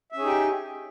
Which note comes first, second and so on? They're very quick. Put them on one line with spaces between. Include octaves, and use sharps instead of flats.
E5 C#4 G#4 D#4 G4